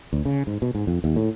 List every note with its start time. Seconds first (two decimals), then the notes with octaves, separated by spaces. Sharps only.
0.13 D2
0.25 C#3
0.47 G#2
0.62 B2
0.75 G#2
0.87 F2
1.04 D#2
1.16 A2